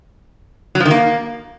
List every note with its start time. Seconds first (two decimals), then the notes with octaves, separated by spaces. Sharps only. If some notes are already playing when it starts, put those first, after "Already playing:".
0.75 F#3
0.80 F3
0.85 D#3
0.91 A#3